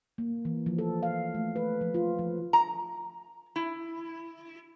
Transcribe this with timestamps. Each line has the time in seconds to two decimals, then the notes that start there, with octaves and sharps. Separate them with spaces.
0.18 A#3
0.45 E3
0.66 F3
0.79 A4
1.03 F5
1.34 A3
1.56 B4
1.81 F3
1.94 F4
2.19 F3
2.53 A#5
3.56 E4